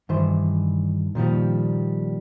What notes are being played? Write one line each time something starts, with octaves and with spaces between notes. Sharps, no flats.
G2 D#3 E3 C5
A#2 D#3 F3 G3